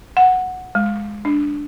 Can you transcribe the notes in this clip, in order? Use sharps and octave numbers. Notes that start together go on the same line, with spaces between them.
F#5
G#3
D4